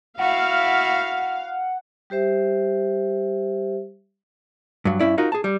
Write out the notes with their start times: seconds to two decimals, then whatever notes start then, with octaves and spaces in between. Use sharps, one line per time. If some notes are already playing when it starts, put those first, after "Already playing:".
0.19 E4 F#4 F5 F#5
2.10 G3 G4 C5 E5
4.85 G2 F#3
5.00 G2 C#4 E4 D5
5.18 D#4 F4 F#4 A#4 D#5
5.32 G#4 A5
5.44 G3